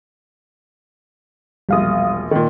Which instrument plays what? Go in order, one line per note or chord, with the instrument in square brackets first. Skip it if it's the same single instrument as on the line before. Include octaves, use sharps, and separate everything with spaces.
[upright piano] E1 A#1 [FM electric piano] G3 F5 D#6
[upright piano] A#2 D#3